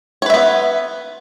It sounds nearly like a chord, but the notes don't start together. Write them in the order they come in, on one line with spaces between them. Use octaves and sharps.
C#5 B4 E5 B3